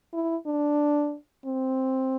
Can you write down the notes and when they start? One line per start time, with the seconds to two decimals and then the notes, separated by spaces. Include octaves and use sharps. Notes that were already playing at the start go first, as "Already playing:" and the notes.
0.13 E4
0.46 D4
1.46 C4